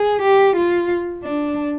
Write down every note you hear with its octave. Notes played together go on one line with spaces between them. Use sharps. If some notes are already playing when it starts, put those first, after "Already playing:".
Already playing: G#4
G4
F4
D4